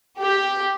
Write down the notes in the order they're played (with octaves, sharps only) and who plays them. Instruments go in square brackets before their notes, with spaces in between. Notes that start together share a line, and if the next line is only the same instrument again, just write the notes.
[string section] G4